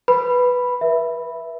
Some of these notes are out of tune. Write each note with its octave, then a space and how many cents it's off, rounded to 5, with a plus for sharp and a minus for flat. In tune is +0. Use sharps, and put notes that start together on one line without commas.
B4 +0 B5 +0
B4 -35 E5 +0